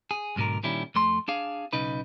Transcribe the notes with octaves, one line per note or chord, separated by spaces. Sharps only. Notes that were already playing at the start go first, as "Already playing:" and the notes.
G#4
B1 G#2 B2 D3 A#4
A#2 D#3 G3 C#4 E4
F2 A3 C6
D4 G#4 F5
B1 C#3 D#4 B4